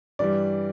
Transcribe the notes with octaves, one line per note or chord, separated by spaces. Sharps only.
G2 E3 G3 D5